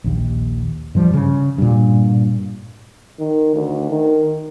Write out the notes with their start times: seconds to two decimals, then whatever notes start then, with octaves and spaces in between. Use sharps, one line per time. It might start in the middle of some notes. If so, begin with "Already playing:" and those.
0.04 A#1 D#2
0.95 G2 F3 G3
1.14 C#3
1.58 G2 A#2
3.20 D#3
3.55 D2
3.90 D#3